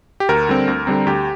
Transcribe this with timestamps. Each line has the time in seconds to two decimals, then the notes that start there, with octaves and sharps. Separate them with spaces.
0.20 G4
0.29 D2 A#4
0.49 D3 G3 C4
0.68 D2
0.87 D3 G3 C4
1.07 D2 G4